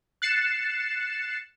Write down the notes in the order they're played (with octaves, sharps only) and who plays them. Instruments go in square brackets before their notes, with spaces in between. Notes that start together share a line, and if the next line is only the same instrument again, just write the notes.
[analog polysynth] F#6 A6 C7 C#7 E7